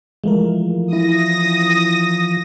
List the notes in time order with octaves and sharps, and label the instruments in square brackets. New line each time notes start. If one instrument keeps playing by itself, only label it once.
[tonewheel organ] E3 F3 [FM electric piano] G#3 A3 A#4
[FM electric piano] E4 [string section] D#6 A#6